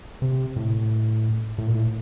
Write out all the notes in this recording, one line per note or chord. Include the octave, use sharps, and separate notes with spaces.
C3
A2
A2
A#2
A2